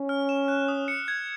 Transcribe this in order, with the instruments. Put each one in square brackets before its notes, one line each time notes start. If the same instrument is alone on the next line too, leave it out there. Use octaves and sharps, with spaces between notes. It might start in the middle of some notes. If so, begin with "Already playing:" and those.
Already playing: [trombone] C#4
[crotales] F6
E7
F#6
D#6
C#7
G#6